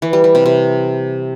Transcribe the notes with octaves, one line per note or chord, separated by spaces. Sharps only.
E3
G3
G3
C3
C3